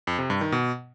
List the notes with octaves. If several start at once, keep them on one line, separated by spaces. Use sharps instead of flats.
F2
C3
G2
D#3
B2